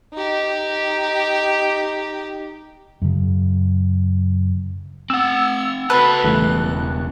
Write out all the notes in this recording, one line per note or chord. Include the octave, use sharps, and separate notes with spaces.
D#4 G4
F#2 C#3
C4 F#5 E6
F#4 A4 B4 A5 F#6
E1 C#3 E3 G3 A3